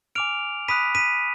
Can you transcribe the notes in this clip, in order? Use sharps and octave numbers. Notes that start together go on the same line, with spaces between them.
G#5 D6 F6 D7 F7
B5 D#6 F#6 B6 D#7
B6 D#7